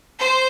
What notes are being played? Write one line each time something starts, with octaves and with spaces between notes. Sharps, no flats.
C5